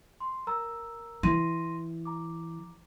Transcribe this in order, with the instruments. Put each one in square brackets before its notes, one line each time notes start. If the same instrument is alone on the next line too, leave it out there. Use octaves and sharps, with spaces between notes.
[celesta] C6
A#4 A#5 E6
[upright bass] E3 [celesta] C6 A#6 D#7
[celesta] A#5 D6